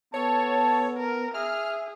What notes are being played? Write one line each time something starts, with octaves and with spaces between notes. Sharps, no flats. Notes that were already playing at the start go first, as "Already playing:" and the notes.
B3 A4 C#5 A5
A#4
G#4 E5 F6